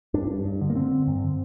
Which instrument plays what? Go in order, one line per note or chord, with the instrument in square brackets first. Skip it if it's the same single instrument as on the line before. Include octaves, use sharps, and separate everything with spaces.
[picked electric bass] G2 D4
G2
G2
D3
A#3
D3 C4
D3
G2
D3